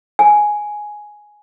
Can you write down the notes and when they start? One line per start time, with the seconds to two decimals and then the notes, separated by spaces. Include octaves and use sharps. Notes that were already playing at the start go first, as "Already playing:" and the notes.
0.19 G#5